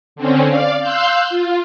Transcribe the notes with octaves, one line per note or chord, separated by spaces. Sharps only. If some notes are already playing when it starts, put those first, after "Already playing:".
D3 C4 C#4
D5 F5
F5 C6 E6 F#6 G6
F4